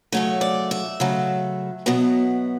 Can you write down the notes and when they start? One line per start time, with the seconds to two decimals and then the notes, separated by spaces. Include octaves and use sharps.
0.12 C#3 F#3 A3 C#5
0.41 D5
0.71 E5
1.00 C#3 F#3 A3
1.86 B2 F#3 B3